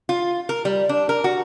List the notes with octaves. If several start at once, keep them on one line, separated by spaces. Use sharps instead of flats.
F4
A#4
G3
D4
A#4
F#4